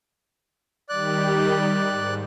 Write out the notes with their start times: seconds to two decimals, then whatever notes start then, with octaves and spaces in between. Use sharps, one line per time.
0.89 D#3 G3 G4 D5 F#6
1.88 G#2